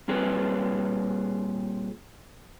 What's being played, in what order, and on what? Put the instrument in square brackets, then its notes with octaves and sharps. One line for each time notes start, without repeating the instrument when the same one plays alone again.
[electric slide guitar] A#2 G3 C4 G#4 B4 C#5